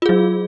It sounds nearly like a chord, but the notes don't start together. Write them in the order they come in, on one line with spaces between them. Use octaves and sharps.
F4 G#4 F#3